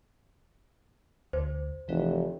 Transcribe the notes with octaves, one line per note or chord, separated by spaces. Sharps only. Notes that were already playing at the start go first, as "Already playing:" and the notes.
D2 C5
F1 E3